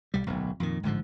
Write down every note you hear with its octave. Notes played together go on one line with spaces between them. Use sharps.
B1 G3
D1 B1
F2 A#2 D#3
A1 G#2 D3 F3